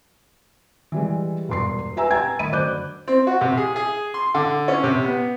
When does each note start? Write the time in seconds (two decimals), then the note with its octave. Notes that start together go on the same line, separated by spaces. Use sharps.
0.92 E3 G3 G#3
1.49 E1 G2 C6 C7
1.97 G4 B4 E5 G#5 A#5 E6
2.11 G5 G#5 A#5 G#6 A6
2.39 A2 D#3 D#5 B5 D#7
2.52 F#2 D3 C5 D6 F#6 G6
3.08 C4
3.27 F#4
3.41 C3
3.57 G#4
3.76 G#4
4.14 C6
4.35 D3
4.68 C#4
4.83 C3
5.04 B3